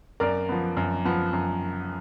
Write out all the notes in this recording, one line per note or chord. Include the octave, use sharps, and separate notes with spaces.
F#2 A#4 D5
F3 B3
F#2
F3 B3
F#2